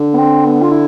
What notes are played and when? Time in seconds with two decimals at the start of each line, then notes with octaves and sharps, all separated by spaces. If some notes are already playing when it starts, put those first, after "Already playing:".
Already playing: D3
0.14 B3
0.19 C4
0.45 B3
0.62 F4
0.71 E4